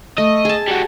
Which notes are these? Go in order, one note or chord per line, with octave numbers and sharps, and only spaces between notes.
A3 D#5
G#4 A5
G3 F#4